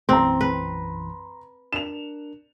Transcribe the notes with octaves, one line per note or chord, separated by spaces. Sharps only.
B1 F#2 E3 C4 A#5 C6
B4
D4 A#4 E7 F7